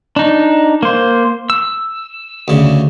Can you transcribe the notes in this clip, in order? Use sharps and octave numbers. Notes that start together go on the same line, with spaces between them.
D4 D#4
A#3 C5
E6
D2 C#3